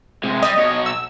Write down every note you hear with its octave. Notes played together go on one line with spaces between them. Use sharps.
C3 G#3
G3 D#5
B2 C#5
E6